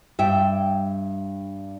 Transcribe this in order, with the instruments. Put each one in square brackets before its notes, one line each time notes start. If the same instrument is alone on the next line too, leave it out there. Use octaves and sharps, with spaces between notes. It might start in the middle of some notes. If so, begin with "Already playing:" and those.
[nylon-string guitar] G2 E5 G5